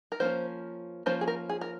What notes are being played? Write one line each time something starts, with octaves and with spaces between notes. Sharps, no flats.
A#4
F3 A#3 C#4 C5
F3 A#3 C#4 C5
G#4
A#4
G#4
A#4